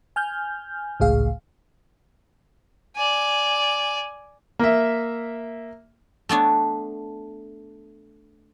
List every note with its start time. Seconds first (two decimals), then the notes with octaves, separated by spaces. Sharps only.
0.16 G#5 F6 G6
1.00 G#1 C#2 A2 G#4 F5
2.96 D5 G#5
4.59 A#3 E5
6.29 A3 B3 D4 C#5